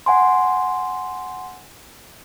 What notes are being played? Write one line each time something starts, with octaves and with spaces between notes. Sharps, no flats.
F#5 G#5 C6